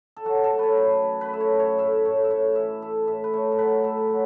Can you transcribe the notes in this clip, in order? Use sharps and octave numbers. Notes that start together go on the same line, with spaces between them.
A4
F#3 F#4
A4
A3
B4 C#5
F#2
B4
F#2
B4
A3
E5
C#5
F#2
C#5
A2 E5
A2 C#5
E5
A2 C#5
E3 E5
A3 E5
A2 E5
B4
A3 C#5
A4
F#3 B4
A3 A4
F#3